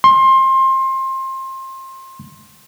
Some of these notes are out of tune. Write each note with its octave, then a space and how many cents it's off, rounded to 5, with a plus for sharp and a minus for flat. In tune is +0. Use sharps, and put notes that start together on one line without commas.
C6 +25